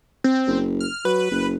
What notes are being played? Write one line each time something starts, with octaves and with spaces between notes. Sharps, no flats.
C4
F#1
F6
F#3 B4
F#1